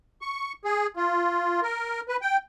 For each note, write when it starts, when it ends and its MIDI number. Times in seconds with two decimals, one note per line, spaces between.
0.21 0.53 85
0.64 0.87 68
0.96 1.60 65
1.62 2.00 70
2.08 2.16 71
2.22 2.37 79